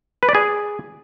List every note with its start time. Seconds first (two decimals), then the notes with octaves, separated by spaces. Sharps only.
0.23 B4
0.29 D5
0.35 G#4